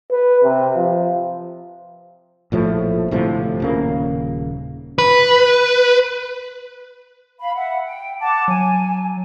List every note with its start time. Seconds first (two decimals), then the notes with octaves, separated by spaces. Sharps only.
0.11 B4
0.43 C3
0.76 F3
2.52 A#1 A2 F3 A3
3.11 G1 A2 C3 F3
3.60 D#1 C#3 A#3
4.98 B4
7.39 F5 B5
7.55 E5 F#5
7.86 G5
8.20 F#5 A5 D6
8.48 F#3 G#5